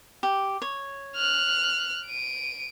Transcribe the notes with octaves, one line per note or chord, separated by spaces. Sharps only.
G4
C#5
F6 F#6
D7 D#7